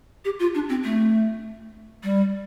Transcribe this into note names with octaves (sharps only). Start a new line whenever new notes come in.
G4
F4
D4
C4
A3
G3